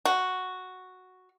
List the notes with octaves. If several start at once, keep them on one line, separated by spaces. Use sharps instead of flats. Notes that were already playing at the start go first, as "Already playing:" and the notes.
F#4